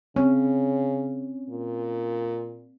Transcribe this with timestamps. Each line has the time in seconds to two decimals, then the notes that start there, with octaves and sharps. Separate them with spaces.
0.16 C#3 C4 C#4
1.50 A#2